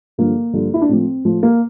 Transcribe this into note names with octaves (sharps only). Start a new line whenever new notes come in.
G2 D3 F3 A#3
G2 D3 F3
E4
D4
A2 F3 C4
A2 F3
A#3